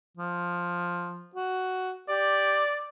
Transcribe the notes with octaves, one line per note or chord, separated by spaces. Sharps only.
F3
F#4
G4 D5